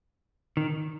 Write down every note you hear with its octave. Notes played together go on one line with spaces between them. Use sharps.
D#3